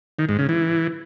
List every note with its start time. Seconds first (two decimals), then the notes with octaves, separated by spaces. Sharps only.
0.19 D#3
0.29 G#2
0.39 C#3
0.49 E3